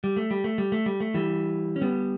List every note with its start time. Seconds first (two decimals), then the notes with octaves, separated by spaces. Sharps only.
0.04 G3
0.17 A3
0.31 G3
0.44 A3
0.58 G3
0.72 A3
0.86 G3
1.00 A3
1.14 E3 G3
1.76 C#4
1.81 G3 B3